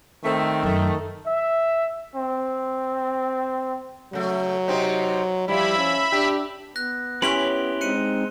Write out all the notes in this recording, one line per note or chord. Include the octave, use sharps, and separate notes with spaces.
D#3 A3 C4
F#2 A3
E5
C4
C#3 F#3 A3
C3 C4 D#4
F3 G3 E4 E5 B5
C#4
D4 G4
B3 F#6 A#6
C#4 E4 G4 B4 C6 F7 G7
G#3 C4 D#4 F#6 C#7 D#7